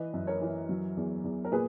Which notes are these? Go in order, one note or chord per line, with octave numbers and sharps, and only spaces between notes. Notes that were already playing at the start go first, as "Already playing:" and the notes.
Already playing: E3 B4 D#5
F#2
A#4 C#5
E3
F#3
E2
E2
A#4
A#2 G#4 B4